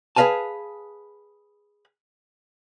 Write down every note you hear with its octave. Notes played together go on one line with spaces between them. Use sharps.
G#4 B4 D#5 F5 G#5 A5